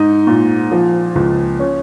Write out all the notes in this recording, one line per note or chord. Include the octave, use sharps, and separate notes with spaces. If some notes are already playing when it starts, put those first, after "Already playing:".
Already playing: G#2 D#4
A#2
F3
C#2
C#4